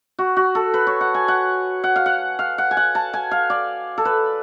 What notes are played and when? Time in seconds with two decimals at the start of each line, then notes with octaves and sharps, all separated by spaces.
0.19 F#4
0.37 F#4
0.55 A4
0.74 B4
0.87 C#5
1.01 F#5
1.14 G#5
1.28 F#5
1.84 F#5
1.96 F5
2.06 F#5
2.39 F5
2.58 F#5
2.71 G#5
2.77 F#5
2.95 A5
3.13 G#5
3.31 F5
3.50 D5
3.98 A4
4.05 B4